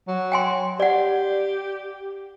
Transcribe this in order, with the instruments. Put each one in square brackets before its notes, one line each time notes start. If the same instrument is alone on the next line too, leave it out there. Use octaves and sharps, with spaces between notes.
[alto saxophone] F#3
[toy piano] G5 G#5 C6
[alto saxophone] G4 [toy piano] D5 F#5